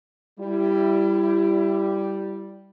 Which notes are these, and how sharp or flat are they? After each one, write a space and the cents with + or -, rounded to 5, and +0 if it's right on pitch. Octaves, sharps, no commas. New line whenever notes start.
G3 +0 E4 +25